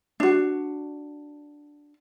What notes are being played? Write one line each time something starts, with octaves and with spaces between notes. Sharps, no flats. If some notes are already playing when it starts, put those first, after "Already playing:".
D4 F#4